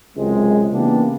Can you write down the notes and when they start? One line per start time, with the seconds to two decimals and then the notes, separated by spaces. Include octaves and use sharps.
0.17 C#2 F#2 C3 G#3
0.72 C#3 E3 A#3 B3 D4 G4